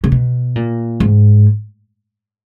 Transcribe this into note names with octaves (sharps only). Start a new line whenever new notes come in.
C#3
B2
A#2
G#2